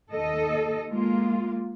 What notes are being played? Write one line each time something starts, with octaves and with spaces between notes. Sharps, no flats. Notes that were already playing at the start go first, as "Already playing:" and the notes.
D#2 A4 D#5
G#3 A#3 F4